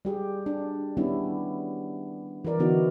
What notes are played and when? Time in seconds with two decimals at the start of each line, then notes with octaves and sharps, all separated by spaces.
0.05 G3 G4 G#4
0.46 D4
0.97 D#3 G3 B3 C#4 D4 E4
2.45 E3 E4 A#4 D5
2.59 D3 E3 B3 D#4 F#4